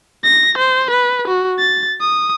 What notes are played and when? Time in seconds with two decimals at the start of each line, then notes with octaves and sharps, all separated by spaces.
0.24 A#6
0.58 C5
0.91 B4
1.28 F#4
1.59 A6
2.01 D#6